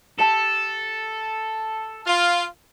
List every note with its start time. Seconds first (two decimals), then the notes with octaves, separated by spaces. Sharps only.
0.19 G4 A4 A5
2.07 F4